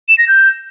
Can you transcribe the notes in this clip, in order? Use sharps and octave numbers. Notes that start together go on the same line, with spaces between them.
E7
A#6
G6